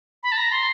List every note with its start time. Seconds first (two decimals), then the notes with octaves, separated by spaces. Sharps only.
0.23 B5
0.32 A5
0.37 A#5
0.52 C6